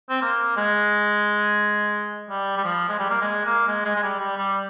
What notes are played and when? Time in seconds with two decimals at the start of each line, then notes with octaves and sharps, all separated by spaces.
0.10 C4
0.22 A#3
0.57 G#3
2.30 G3
2.57 G3
2.64 F3
2.89 G#3
2.99 G3
3.10 A#3
3.22 G#3
3.45 A#3
3.68 G#3
3.85 G#3
3.96 G#3
4.03 G3
4.20 G3
4.37 G3